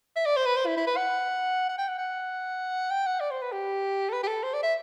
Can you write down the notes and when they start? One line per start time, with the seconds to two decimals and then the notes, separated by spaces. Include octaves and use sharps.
0.16 E5
0.26 D5
0.37 C5
0.46 B4
0.57 C5
0.66 E4
0.77 E4
0.87 B4
0.97 F#5
1.69 F#5
1.78 G5
1.88 F#5
1.99 F#5
2.91 G5
3.06 F#5
3.20 D5
3.31 C5
3.42 B4
3.52 G4
4.09 A4
4.13 B4
4.23 G4
4.28 A4
4.43 C5
4.54 D5
4.63 E5